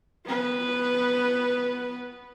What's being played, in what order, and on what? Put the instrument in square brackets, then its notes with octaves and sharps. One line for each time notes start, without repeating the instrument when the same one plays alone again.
[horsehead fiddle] B3 B4